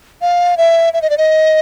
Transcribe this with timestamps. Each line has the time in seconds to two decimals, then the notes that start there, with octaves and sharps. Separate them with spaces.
0.22 F5
0.58 E5
0.93 E5
1.02 D#5
1.10 D5
1.18 D#5